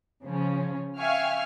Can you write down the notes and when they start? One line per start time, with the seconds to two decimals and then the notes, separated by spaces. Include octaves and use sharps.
0.24 C#3 F3 C#4
0.99 E5 F5 G5 G#5 C#6 F6